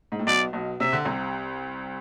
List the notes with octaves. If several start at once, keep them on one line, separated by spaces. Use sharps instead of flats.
G#2
A2
B1 B2 D5
B1 B2
C3 E5
D3
C2 C3